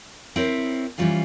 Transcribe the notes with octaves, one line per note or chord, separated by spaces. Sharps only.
C4 E4 A#4 C#5
E3 G3 C#4 F4 C5